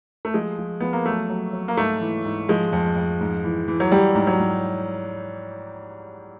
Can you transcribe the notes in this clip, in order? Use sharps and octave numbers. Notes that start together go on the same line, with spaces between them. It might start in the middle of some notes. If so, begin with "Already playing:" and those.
A3
F3 G#3
F3
F3 B3
A#3
F#3 A3
F#3
F#3
A#3
G#2 A3
E3
G#2
F3 G#3
F2
F2
G#2
E3
E3
F#3
F#3 G3
G#2
F#3
G#2